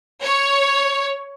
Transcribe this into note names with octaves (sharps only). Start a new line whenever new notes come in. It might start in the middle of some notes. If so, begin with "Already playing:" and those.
C#5